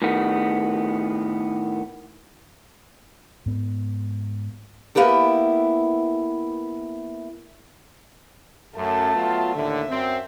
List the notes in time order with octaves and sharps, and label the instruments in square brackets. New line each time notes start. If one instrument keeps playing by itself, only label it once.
[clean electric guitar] A2 D#3 B3
[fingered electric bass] G#2 B3
[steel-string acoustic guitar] A#3 B3 E4 G4 A4
[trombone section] F#2 [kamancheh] A3 A5
[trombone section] F#3 B3 F4
[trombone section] D#2 A2 D3 [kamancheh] E5
[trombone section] F#2 C4